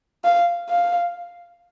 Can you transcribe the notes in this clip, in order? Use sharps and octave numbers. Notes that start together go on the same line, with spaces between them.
F5
F5